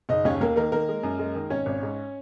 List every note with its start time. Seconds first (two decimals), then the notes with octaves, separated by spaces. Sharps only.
0.09 F#1 D#4 D#5
0.25 D#2 C#4 C#5
0.41 D#2 A#3 A#4
0.56 D#3 A#3 A#4
0.72 D#3 A#3 A#4
0.89 G#3
1.03 F#2
1.19 G#3
1.35 D#3
1.50 G#1 C#4 C#5
1.66 G#1
1.83 G#2